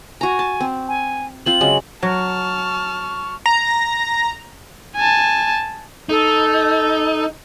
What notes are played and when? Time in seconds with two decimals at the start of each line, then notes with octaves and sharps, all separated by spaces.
0.21 F#4 G#5 A#5
0.39 A5
0.60 C4
0.88 G#5
1.46 C4 F4 F#7
1.61 C#3 F#3 G#3
2.03 F#3 A5 C#6 F6
3.46 A#5
4.96 G#5 A5
6.09 D#4 A4